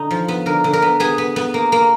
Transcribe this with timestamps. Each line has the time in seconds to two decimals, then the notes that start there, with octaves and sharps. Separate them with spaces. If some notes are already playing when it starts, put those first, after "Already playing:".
Already playing: D3 D#4
0.11 F3
0.28 B3
0.46 D3 A#4
0.64 D3
0.73 A#4
0.82 B3
1.00 B3 G#4
1.18 B3
1.36 B3
1.54 A#3
1.72 A#3